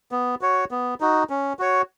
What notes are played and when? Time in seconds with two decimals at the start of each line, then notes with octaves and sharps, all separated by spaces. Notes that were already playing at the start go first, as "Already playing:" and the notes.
0.12 B3
0.41 F#4 C#5
0.71 B3
1.00 D#4 F#4
1.30 C#4
1.59 F#4 C#5